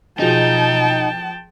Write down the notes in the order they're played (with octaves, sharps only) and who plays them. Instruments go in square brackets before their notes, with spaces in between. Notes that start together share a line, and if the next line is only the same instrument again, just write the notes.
[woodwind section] B2 [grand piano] F3 G#4 [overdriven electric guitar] D#4 [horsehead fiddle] G5 A5